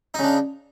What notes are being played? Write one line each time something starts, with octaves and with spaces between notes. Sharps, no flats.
C#3 D4 D#4